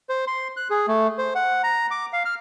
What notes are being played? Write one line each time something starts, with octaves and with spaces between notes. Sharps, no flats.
C5
C6
F#6
G#4
A3
C5
F#5
A#5
D6
F5
F6